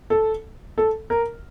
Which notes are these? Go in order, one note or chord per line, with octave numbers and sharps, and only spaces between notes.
A4
A4
A#4